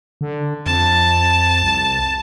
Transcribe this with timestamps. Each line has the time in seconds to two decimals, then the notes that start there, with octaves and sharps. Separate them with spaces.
0.21 D3
0.66 F2 A5
1.63 C2